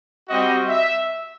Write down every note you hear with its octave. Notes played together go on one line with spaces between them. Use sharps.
G3 C4 F#4 D#5
E5